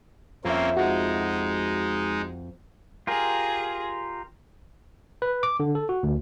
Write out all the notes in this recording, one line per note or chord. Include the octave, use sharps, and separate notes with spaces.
F2 A#3 C4 C#4 E5
G#3 D#4 F#4
F4 G4 G#4 A#4
B4
D6
D3
A4
F#4
D2